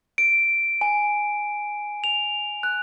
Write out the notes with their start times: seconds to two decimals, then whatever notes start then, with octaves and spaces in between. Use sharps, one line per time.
0.18 D7
0.81 G#5
2.04 F7
2.63 F#6